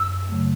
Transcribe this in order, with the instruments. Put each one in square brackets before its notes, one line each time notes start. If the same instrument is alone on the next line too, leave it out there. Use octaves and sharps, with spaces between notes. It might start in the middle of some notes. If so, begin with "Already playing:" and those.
Already playing: [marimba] F#2 [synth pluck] E6
[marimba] C#3 F#3 A3